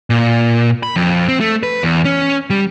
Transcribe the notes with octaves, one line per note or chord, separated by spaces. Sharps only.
A#2
B5
F2
C4
A3
B4
E2
C#4
G3